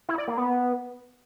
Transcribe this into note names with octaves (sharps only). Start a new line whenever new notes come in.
E4
D5
A#3
B3